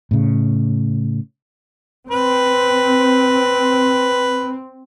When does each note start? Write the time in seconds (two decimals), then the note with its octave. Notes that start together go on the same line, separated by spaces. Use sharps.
0.11 A2 C#3
2.11 C4 B4